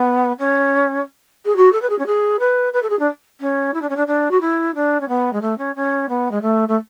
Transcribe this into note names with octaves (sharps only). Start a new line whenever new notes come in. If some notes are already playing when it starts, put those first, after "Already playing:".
Already playing: B3
C#4
G#4
F#4
A4
B4
G#4
C#4
G#4
B4
B4
A4
G#4
D4
C#4
E4
D4
C#4
D4
D4
F#4
E4
D4
C#4
B3
G#3
A3
C#4
C#4
B3
G#3
A3
A3